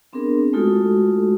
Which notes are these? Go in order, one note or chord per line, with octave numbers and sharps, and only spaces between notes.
B3 C4 D4 G#4 A#4
G#3 A3 D#4 F4 F#4 A4